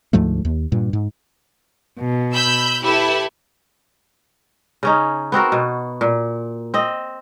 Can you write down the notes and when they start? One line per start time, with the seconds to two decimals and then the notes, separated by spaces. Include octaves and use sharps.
0.13 D2 G#2 F3 A3
0.45 D#2
0.72 G2 A#2
0.93 G#2
2.00 B2
2.35 B5 E6 G6
2.84 E4 G4 A4 B4
4.83 C#3 C#4 D#4
5.32 B3 C4 F#4 A#4
5.52 B2
6.01 A#2
6.74 C4 D#5